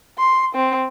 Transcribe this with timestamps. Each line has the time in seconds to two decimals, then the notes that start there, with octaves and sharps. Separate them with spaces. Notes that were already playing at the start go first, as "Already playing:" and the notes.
0.18 C6
0.55 C4